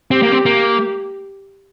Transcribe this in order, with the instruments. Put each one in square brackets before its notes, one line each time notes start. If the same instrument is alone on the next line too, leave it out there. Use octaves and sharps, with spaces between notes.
[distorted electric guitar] C4 [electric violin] G4
[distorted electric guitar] A#3
C4
A#3